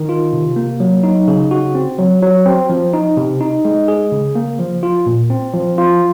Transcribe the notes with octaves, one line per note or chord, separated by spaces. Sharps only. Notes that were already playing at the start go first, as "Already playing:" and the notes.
Already playing: D#3
F4
C3
A#3
F#3
D#4
C#3
F#4
C4
F#3
F#3
C4
F3
D#4
C3
D#4
G#3
G#4
C#3
A#3
F3
F4
A#2
C4
F3
F4